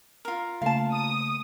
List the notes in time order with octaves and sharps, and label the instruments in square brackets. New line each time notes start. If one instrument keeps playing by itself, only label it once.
[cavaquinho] F4 A#4
[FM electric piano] C#3 A3 A#3 [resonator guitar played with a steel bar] F5 A5
[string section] D#6